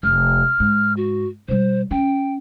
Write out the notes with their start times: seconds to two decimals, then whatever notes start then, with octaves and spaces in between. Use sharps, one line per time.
0.03 F1 F6
0.60 G#2
0.97 F#4
1.48 B2 G3 C5
1.91 C#4 G5